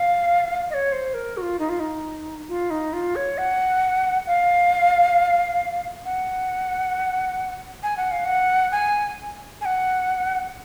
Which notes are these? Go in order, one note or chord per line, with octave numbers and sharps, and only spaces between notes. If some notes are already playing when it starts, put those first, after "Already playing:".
Already playing: F5
D#5
C#5
C5
A#4
F#4
F4
D#4
F4
D#4
F4
D#4
F4
C#5
F#5
F5
F#5
G#5
F#5
F5
F#5
G#5
G#5
F#5